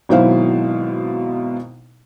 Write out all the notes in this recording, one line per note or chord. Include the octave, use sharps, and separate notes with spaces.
G#1 B2 F#3 E4 C5 F5